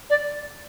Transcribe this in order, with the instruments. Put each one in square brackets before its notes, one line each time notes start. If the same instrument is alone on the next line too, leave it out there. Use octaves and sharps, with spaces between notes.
[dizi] D5